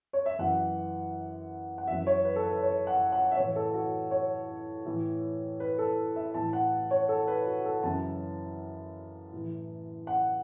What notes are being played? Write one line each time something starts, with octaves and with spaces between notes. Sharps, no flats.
C#5
E5
F#2 E3 F#5
F#5
F#2 E3 E5
C#5
B4
A4
B4
C#5
F#5
F#5
E5
A2 E3 C#5
A4
F#4
C#5
A2 E3
B4
A4
E5
A2 E3 A5
F#5
C#5
A4
B4
F#4
A4
F#2 C#3 E3 A5
A2 E3
F#5